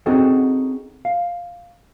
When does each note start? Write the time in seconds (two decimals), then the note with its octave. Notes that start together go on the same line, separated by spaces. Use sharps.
0.06 C4 C#4 D#4 F#4 G#4 A4
1.05 F5